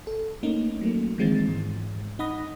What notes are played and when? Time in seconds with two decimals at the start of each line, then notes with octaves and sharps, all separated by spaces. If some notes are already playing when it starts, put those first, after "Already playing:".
0.07 A4
0.43 A3 A#3 C#4 D#4
0.81 F#3 A3 A#3
1.18 D#3 E3 G#3 C4 F4 A6
1.48 G#2
2.19 D#4 F#5 B5 D#6 A#6